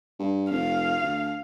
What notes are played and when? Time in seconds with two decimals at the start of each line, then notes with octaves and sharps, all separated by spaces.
0.19 G2
0.51 F1 F5
1.03 D2